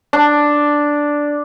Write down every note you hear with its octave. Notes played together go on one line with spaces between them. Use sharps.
D4